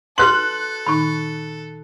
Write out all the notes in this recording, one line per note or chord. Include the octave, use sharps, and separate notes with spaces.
F#4 A4 B4 C6 F#6 F#7
A#2 D#3 D#4 B5 C#6